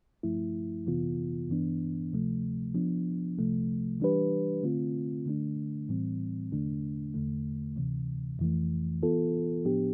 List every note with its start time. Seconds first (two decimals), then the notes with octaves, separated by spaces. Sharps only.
0.23 G2 F3 A3 E4
0.86 F2 C3 E3 B3 F4
1.49 G2 E3 B3 D4
2.12 D2 C3 F3 A3
2.75 F3 B3 D4
3.38 C2 C3 F3 A3
4.00 E3 G3 D4 G4 B4
4.63 D3 A3 C4 F4
5.26 D3 A3 D4
5.89 A2 E3 G3 C4
6.52 E2 D3 A3 D4
7.14 E2 D3 A3
7.76 D2 C3 E3
8.39 F2 E3 A3
9.02 E3 B3 F4 A4
9.65 A2 F3 B3 D4 G4